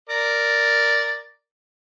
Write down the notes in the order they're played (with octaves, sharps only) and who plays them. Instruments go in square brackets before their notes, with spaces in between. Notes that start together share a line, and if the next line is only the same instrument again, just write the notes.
[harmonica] A#4 D5